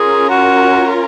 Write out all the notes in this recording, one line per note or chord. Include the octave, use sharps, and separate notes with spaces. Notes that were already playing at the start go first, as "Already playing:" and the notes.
Already playing: C#4 F4 G#4 A#4
F#4